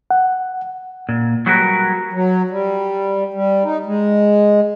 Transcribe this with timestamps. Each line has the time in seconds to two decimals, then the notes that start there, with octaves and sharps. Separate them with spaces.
0.11 F#5
1.09 A#2
1.46 F#3 G3 F#4 G#4 A#4 B4
2.11 F#3
2.51 G3
3.34 G3
3.64 D#4
3.86 G#3